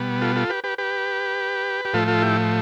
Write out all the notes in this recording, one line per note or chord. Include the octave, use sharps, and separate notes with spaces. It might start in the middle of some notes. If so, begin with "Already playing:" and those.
Already playing: B2 G3 B3
F4 A4
F4 A4
G4 B4
G4 B4
G4 B4
G4
A2 F3 A3 F4 A4
F4 A4
E4 G4